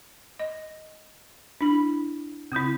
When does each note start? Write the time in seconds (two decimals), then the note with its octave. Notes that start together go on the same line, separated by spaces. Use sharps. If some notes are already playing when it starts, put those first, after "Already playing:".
0.39 D#5
1.61 D4 E4 B5
2.52 C#3 C4 E4 D#6 G6